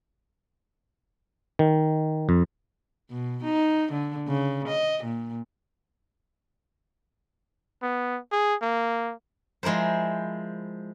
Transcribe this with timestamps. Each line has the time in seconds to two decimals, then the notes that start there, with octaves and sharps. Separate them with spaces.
1.59 D#3
2.29 F2
3.11 B2
3.44 D#4
3.93 D3
4.28 C#3
4.68 D#5
5.04 A#2
7.83 B3
8.32 G#4
8.62 A#3
9.63 F3 G#3 E4 A#4 C5